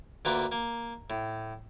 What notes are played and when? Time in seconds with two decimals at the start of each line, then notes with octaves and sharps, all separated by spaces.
0.25 D2 A#3 F4 B4 F#5 D6
0.52 A#3
1.10 A2